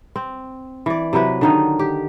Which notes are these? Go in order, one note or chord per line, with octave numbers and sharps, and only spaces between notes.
C4
E3 D5
C3 F#3 E4 B4
D3 D#3 D#4
G4